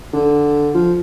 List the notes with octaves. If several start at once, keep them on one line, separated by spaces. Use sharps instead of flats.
D3
F3